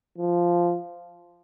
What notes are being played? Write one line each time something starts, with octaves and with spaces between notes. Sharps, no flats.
F3